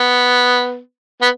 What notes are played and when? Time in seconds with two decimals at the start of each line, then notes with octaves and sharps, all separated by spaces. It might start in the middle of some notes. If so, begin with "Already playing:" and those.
Already playing: B3
1.22 B3